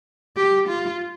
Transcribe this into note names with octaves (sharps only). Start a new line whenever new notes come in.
G4
F4